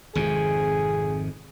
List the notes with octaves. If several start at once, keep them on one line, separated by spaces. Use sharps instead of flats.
G#1 F2 C3 G#4